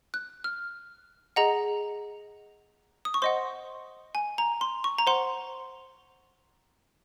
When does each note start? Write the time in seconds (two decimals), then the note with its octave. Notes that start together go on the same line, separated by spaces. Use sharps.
0.14 F#6
0.44 F6
1.36 G#4 D#5 F#5 A#5
3.05 D#6
3.14 C#6
3.22 C5 D#5 F#5 C6
4.15 G#5
4.38 A#5
4.61 C6
4.84 C#6
4.98 A#5
5.07 C5 F#5 C6